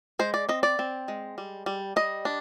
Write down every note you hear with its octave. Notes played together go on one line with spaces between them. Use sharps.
G#3 C5
D5
C4 D#5
D5
C4
G#3
G3
G3
G3 D#5
D4